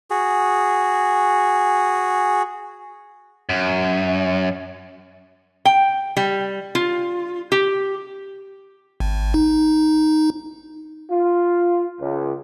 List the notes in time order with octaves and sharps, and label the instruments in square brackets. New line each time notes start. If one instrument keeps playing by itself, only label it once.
[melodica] F#4 G#4
[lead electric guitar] F#2
[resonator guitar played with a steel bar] G5
G3
F4
G4
[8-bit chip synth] G#1
D#4
[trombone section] F4
C#2